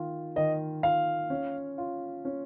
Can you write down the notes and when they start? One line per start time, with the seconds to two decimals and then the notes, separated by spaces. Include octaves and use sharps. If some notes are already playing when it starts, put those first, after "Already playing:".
Already playing: D#3 F4
0.36 D#3 D#5
0.83 F4 F5
1.30 C#4
1.78 F4
2.25 C#4